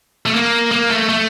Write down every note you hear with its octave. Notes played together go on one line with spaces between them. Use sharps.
A3
A#3
A#3
A3
A3